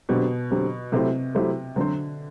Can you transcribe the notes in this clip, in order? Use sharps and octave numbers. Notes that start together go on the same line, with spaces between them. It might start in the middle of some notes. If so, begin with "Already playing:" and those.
B2 D3 F#3 C4 G4
D3 F#3 C4 G4
C3 F#3 A3 E4 G4 C5
F#3 A3 E4 G4 C5
D3 F#3 C4 F#4 C5